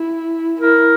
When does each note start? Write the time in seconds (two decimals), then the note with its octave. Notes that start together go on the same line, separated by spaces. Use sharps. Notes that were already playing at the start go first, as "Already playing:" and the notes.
Already playing: E4
0.60 E4 A#4